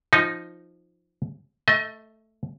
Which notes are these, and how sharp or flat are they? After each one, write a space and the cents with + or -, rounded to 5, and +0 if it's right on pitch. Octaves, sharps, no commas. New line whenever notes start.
F3 +0 D#4 +0
A3 +0 D#5 +30